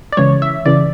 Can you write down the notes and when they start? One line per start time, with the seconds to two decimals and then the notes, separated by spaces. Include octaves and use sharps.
0.12 D5
0.17 C#2 C#3 E3 C#5
0.42 E5
0.65 C#2 C#3 E3 D5